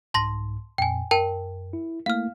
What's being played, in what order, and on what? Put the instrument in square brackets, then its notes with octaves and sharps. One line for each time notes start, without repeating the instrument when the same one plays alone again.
[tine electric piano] C2 G#2 [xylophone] A5 C6 A#6
[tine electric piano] F2 A#2 [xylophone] G5 G#5
[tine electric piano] F#2 [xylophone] A#4 G5 A5
[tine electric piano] E4
[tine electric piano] A3 A#3 E4 [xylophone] F5 F6